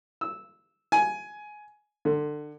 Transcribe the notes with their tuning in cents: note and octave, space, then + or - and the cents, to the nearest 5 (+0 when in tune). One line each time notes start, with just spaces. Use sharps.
E6 -10
G#5 +15
D3 +25